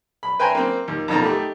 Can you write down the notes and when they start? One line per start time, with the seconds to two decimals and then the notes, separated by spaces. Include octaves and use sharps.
0.23 B5
0.40 B4 E5 G5 G#5 A#5 C6
0.55 A#3 C4
0.88 D#2
1.08 F2 B2 D#3 F4 A5 A#5
1.22 A3 D#4 G4